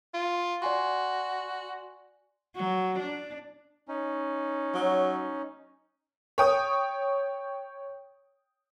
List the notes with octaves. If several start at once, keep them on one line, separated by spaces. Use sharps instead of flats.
F4
F#4 D5 G#5 C6
F#3
D4
C#4 D#4
F#3
C#5 G5 D#6